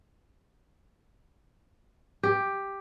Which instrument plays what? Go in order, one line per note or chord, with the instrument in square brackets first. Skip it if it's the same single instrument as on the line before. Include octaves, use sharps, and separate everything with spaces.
[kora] G4